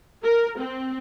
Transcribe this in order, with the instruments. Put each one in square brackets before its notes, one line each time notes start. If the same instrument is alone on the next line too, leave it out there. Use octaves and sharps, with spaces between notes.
[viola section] A#4
C4